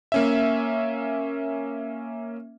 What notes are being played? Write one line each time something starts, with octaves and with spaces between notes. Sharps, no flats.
A#3 C#4 E5